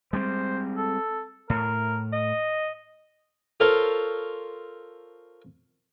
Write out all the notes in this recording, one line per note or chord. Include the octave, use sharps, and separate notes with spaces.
G3 G#3 C4 C5
A4
A2 A#4
D#5
F4 A4 A#4 C5 C#5